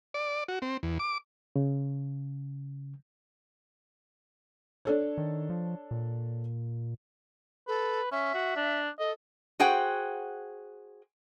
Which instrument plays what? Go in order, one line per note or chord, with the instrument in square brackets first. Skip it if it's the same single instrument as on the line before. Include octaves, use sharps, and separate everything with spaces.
[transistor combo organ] D5
F#4
C4
E2
D6
[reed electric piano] C#3
[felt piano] D4 A4 C#5
[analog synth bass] D#3
F3
A#2
[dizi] A4 [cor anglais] B4
[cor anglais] C#4 [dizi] E5
[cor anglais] F#4
D4
[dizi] A4 [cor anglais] D#5
[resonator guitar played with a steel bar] F#4 G#4 C5 F#5 G5